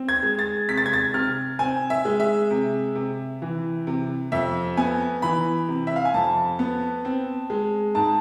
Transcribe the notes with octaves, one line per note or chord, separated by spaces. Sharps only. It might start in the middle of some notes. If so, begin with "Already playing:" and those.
Already playing: C4
G#6
G#3
A6
C3 B6
A6
G#6
A6
C3 F6
C4 G#5
E5
G#3
E5
C3
C3
E3
C3
F2 E5
B3 G#5
E3 B5
C3
E5
F5
G#5
F2 A5
B3
C4
G#3
G#2 A5